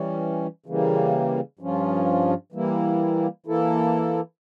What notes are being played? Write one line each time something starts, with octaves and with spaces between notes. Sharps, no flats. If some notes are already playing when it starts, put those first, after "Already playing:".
Already playing: E3 G3 C#4
C#3 E3 G3 A#3
G2 F3 C#4 F4
E3 G3 A#3 E4
E3 A#3 E4 A4